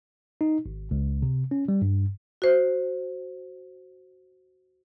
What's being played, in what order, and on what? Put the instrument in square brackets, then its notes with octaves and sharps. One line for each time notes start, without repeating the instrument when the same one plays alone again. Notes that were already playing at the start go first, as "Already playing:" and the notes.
[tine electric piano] D#4
G#1
C#2
C3
C#4
G3
G2
[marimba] F#4 C5